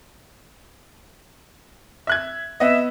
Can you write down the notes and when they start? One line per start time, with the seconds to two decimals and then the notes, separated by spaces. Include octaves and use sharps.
2.07 E5 F#6 G#6
2.60 B3 D#5 E5